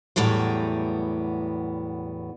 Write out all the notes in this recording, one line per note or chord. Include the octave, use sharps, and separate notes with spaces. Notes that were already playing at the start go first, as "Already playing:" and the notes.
E2 A2 F#3 G3 B3